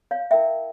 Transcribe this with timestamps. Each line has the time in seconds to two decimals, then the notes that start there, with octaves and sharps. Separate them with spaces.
0.11 C#5 F5
0.31 E4 A#4 C#5 E5 G5